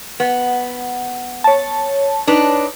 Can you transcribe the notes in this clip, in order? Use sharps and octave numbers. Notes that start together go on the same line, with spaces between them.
B3
C#5 A5
D4 D#4 B4